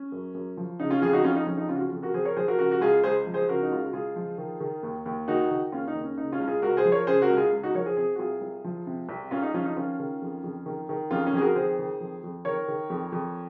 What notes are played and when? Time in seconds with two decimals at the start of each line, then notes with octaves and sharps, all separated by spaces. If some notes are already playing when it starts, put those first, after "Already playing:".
Already playing: C#4
0.12 F#2
0.34 F#2
0.57 F3
0.80 C#3 D#4
0.90 C#4 F4
1.02 F2 F4 G#4
1.13 D#4 F#4
1.24 F2 C#4 F4
1.36 D#4
1.47 F3 C#4
1.57 D#4
1.69 C#3 C#4 F4
1.76 F#4
1.80 C#4 F4
1.92 F2
2.02 F#4 A#4
2.14 F2 G#4 C5
2.25 A#4 C#5
2.36 F3 G#4 C5
2.48 F#4 A#4
2.58 C#3 F#4 A#4
2.71 F#4
2.81 C#2 F4 G#4
3.03 C#2 G#4 C5
3.26 F3
3.34 G#4 C5
3.49 C#3 F#4 A#4
3.62 D#4
3.71 C#2 F4
3.83 F#4
3.93 C#2 F4 G#4
4.16 F3
4.38 D#3
4.60 D#3
4.83 D#2
5.06 D#2
5.28 D#3 D#4 F#4
5.51 D#3
5.72 D#2 C#4 F4
5.88 D#4
5.95 D#2
6.03 C#4
6.18 C#3 D#4
6.32 C#4 F4
6.40 C#2
6.48 F4 G#4
6.62 C#2 F#4 A#4
6.77 G#4 C5
6.85 F3
6.92 A#4 C#5
7.07 C#3 G#4 C5
7.22 F#4 A#4
7.30 C#2
7.37 F4 G#4
7.53 C#2
7.63 D#4 F#4
7.74 F3 A#4 C#5
7.86 G#4 C5
7.97 C3 G#4 C5
8.15 F#4
8.19 C2 F4 G#4
8.41 C2
8.64 F3
8.87 C3
9.09 C2
9.31 C2 C#4 F4
9.42 D#4
9.54 F3 C#4 F4
9.65 D#4
9.76 D#3 C#4 F4
9.99 D#3
10.22 F2
10.44 F2
10.66 D#3
10.89 D#3
11.11 F2 C#4 F4
11.27 C#4
11.33 F2 G#4
11.41 F#4 A#4
11.55 D#3 G#4 C5
11.78 D#3
12.01 F2
12.24 F2
12.45 D#3 A#4 C#5
12.68 D#3
12.90 F2
13.12 F2